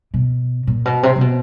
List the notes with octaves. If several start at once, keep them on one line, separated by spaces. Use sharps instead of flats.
B2
A#2
B2
C3
C3
B2